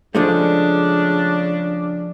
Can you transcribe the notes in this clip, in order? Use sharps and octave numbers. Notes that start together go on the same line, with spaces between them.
C#3 F3 G#3 A3 D4